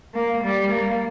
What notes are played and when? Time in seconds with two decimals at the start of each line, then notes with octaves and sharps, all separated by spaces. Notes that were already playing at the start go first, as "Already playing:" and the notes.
0.14 A#3
0.44 G3
0.73 A#3